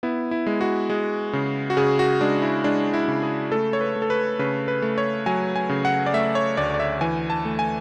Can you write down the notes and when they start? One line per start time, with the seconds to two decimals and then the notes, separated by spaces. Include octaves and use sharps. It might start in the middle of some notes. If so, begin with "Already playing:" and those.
0.03 B3 E4
0.31 E4
0.47 G#3
0.61 F#4
0.90 G#3
1.33 C#3
1.70 F#4
1.77 C#3 G#4
1.99 F#4
2.21 G#3 D4
2.42 E4
2.64 G#3 D4
2.94 E4
3.08 C#3
3.23 G#4
3.52 A3 A4
3.73 C#5
3.81 B4
3.96 A3
4.02 A4
4.10 B4
4.39 C#3 B4
4.68 B4
4.82 A3
4.98 C#5
5.26 F#3 G#5
5.56 G#5
5.70 C#3
5.85 F#5
6.06 D5
6.14 A3 E5
6.35 C#5
6.57 D2 D5
6.74 D5
6.80 E5
7.01 E3 G#5
7.30 A5
7.45 A3
7.59 G#5